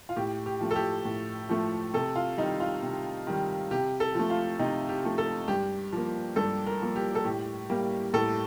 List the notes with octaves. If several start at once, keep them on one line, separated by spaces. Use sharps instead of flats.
F4
A2 G4
G4
F3 A3
A4
G4
A2
F3 A3
C3 A4
F4
D#3 G3 D#4
F4
C3
D#3 G3
C3 G4
A4
F3 A3
F4
C3 D#4
G4
F3 A3
A4
G2 G4
F3 A#3
G2 A4
A#4
F3 A#3
G4
A4
A2 G4
G3 A#3
A2 A4